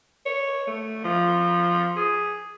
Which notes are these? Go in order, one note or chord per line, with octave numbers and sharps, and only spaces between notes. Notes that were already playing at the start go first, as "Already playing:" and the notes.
C#5
A3
F3
G#4